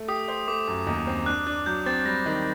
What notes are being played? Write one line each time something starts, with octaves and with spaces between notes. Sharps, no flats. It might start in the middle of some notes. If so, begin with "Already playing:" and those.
Already playing: A3
G4 D#6
C5
A3 D6
F#2
D#2
C4
D4 F#6
D4 F#6
F#3 G6
C4 A6
G3 A#6
D#3